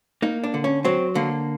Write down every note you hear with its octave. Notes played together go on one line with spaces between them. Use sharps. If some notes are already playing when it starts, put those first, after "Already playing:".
A#3 D#4
D4
D3
C#4
F#3 C4
D3 A#3